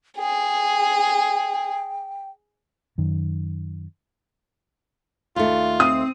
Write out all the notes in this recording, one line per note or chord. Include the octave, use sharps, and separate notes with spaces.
G#4 G5
F#2 D#3
D#2 A3 F4
C4 D#6